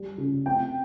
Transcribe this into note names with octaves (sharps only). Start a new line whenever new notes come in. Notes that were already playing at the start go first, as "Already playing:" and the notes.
Already playing: G3
C#3
C4 G5